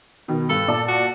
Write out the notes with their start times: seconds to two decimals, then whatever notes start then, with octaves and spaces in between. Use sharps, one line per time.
0.28 B2 D#3
0.50 G2 A4
0.68 A#2 D5 A5
0.88 F#4